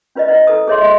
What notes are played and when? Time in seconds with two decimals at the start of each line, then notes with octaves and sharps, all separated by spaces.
0.15 C#4 F4 B4 D5 D#5
0.28 E4 B4 D5 D#5 F#5
0.47 E4 A4 B4 D#6
0.68 G#4 A4 C#5 D#5 E5 C6
0.81 E4 F#4 D#5 C6